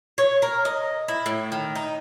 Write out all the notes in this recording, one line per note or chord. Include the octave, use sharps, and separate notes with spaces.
C#5
A#4
D#5
E4
A2
D#3
D#4